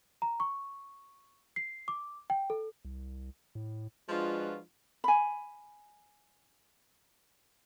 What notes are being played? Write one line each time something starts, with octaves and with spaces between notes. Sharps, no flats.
A#5
C#6
C7
D6
G5
A4
C2
A2
F3 G#3 D4 F4 F#4 B4
G#5 B5